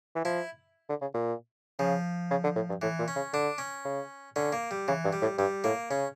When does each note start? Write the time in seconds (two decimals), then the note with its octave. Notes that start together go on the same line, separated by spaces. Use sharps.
0.15 E3
0.25 F3 E4
0.89 D3
1.01 C#3
1.14 A#2
1.79 C#3 F3
2.31 C#3
2.44 D3
2.56 A2
2.69 G2
2.82 A2 E3
2.99 A#2
3.08 C#4
3.16 C#3
3.33 D3 D4
3.58 C#4
3.85 C#3
4.36 D3 C#4
4.53 A#3
4.71 G3
4.88 C#3 E3
5.04 G2
5.13 G3
5.22 A2
5.38 G2 G3
5.64 A2 A#3
5.90 C#3 C#4